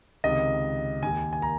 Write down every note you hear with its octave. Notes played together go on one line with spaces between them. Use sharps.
C#2 C3 D#3 D#5
D#2 D#3 G#5
G#5
A#5